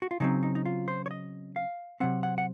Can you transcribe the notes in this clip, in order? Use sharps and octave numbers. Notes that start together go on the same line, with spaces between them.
F#4
F4
C#3 F#3 C4 D#4
D#4
D#4
F4
C5
C#5
D#5
F5
C3 F#3 C4 F#5
F#5
F#5